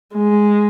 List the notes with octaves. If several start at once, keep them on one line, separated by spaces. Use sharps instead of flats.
G#3